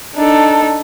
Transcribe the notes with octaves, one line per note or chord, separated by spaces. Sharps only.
D4 D#4 A4